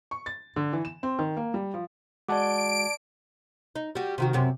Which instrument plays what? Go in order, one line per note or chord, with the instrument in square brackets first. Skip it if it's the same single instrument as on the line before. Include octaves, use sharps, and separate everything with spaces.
[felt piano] C#6
A6
D3
E3
E7
C4
D#3
A#3
G3
F3
[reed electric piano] G#3 F#4 F#5 [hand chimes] D5 A5 D6 [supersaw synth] D7
[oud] D#4
G3 F#4
C3 D#3 F#4
F#2 C3 C4